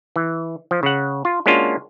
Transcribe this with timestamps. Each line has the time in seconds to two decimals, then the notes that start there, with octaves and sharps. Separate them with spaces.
0.16 E3
0.71 F3
0.83 C#3 F#5
1.25 F4
1.46 G#3 A#3 C#4 D4 F4 F#4